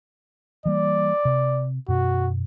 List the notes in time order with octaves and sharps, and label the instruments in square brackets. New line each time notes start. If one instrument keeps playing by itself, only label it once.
[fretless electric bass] E3 G3 A#3 [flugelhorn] D5
[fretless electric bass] C3
[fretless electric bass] F#2 B2 [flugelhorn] F#4